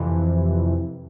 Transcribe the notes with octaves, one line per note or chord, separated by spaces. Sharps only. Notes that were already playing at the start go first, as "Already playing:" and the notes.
Already playing: F2 C3 E3